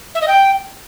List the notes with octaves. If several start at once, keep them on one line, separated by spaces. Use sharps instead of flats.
E5
D#5
G5